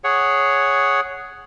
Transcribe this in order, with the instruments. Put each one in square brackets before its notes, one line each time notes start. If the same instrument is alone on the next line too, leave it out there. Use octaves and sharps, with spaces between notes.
[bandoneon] G#4 C#5 F#5